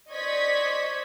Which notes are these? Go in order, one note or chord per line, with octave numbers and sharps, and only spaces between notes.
C5 D5 D#5 C#6 G#6 B6